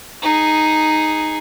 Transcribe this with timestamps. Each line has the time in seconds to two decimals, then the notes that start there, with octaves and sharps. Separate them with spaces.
0.22 D#4 G#4